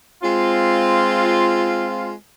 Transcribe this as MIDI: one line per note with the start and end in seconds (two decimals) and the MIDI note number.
0.23 2.12 56
0.23 2.12 60
0.23 2.12 65